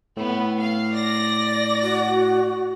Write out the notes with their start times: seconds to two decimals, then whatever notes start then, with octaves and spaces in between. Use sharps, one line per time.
0.17 A2 B3
0.60 F5
0.95 D5 A#6
1.82 F#4